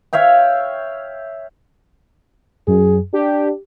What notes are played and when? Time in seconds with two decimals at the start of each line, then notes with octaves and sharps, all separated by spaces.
0.13 C#5 E5 F5 G5
2.67 F#2 G#4
3.13 D4 G4